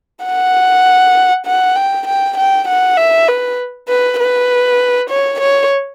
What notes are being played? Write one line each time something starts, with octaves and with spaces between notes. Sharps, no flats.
F#5
F#5
G5
G5
G5
F#5
E5
B4
B4
B4
C#5
C#5